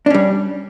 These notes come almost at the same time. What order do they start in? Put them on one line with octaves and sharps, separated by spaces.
D4 C#4 G3